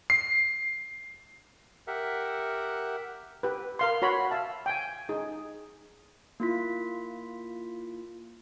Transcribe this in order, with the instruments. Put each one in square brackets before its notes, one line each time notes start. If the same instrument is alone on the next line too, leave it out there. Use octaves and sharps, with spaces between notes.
[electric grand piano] C7
[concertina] G4 A#4 E5 F#5
[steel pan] G4 B4
A#4 F5 C6
F#4 C#5 B5 C6
E5 F5 A5
G5 G#5
D#4 G#4
[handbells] A#3 E4 F4 B6